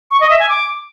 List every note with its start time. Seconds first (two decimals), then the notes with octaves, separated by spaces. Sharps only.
0.11 C#6
0.20 D#5
0.30 E5
0.39 G#5
0.49 D6